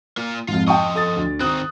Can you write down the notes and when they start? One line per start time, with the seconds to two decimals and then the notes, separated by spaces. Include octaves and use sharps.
0.17 A#3 F4
0.48 F2 G#2 F4
0.68 F3 D#5 G5 A5 C#6
0.95 A4 D#6 A6
1.16 D2
1.40 D#3 C4 D#6 F#6